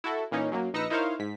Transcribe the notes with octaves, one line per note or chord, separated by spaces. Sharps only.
E4 F#4 A4
A#2 E3 A#3 C#4 D#4
F#2 F#3 A#3
A#1 D#4 B4 E6 A#6 C#7
D#4 E4 A#4 C5 C#5 F5
G#2 B6